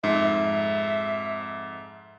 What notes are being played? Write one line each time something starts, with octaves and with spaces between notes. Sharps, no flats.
F2 G#2 E5